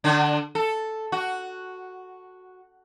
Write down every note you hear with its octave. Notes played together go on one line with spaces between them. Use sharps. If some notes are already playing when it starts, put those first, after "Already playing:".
D3 D4
A4
F#4